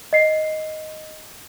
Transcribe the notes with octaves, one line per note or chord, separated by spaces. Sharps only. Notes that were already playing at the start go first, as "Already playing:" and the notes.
D#5 C7